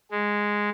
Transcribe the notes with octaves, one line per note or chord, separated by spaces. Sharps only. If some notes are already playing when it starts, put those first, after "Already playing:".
G#3